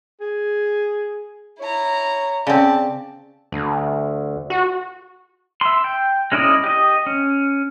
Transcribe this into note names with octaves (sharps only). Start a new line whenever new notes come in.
G#4
E4 C#5 A#5
C#3 C4 D5 A5
D2
F#4
E5 C6
G5
G#3 C#4 E4 D5 D#5
G4 D#5
C#4